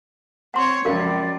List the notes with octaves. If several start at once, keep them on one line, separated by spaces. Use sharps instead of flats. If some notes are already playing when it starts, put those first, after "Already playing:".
C4 C#5 F#5 C6
C#2 F#2 F3 A#4 D5 F5